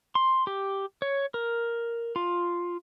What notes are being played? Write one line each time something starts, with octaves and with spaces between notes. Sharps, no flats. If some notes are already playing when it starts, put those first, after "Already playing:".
C6
G4
C#5
A#4
F4